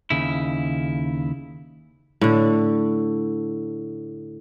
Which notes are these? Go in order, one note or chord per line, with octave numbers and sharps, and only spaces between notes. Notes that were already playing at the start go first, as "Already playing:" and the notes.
D#2 C#3 E4
A2 D3